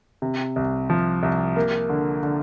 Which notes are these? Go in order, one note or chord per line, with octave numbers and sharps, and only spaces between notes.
C3
C2
F3
C2
A#3
D3
D3